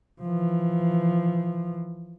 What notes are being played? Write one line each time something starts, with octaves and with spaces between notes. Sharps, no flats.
E3 F3